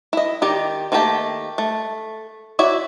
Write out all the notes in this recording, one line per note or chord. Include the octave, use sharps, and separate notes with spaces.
E4 D#5
D#3 G4 D5
D#3 A3 A#3 G4 A5
A3
E4 F#4 C#5 D5 E5